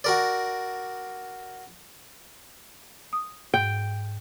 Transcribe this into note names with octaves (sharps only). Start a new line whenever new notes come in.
F#4 A#4 D5
D#6
G#2 G5